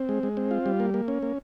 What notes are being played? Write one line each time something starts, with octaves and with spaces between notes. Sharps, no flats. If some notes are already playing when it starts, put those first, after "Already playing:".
Already playing: C4
G#3
G#3
C4
F4
G3
A#3
A#3
C#4
A#3